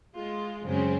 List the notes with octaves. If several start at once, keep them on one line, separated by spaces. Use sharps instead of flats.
G#3 F4
F#2 C#3 F#3 G#3 C4 C#4